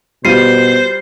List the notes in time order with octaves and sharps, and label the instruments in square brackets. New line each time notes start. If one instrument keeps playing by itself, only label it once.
[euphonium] B2 [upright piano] G3 F4 D#7 [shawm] C5 [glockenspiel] C7